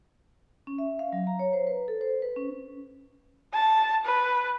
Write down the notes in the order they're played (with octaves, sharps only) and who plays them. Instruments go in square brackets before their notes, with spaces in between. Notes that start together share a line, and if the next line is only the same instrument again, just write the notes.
[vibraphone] C#4
E5
F5
F#3
A#5
C#5
C5
B4
A4
C5
B4
C#4
[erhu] A5
B4